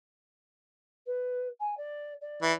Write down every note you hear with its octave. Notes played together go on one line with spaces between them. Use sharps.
B4
G#5
D5
D5
E3